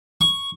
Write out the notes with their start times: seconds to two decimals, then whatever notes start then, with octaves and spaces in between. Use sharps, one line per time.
0.21 C#6